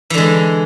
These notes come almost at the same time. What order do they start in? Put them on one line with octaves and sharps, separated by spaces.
E3 D3 G#3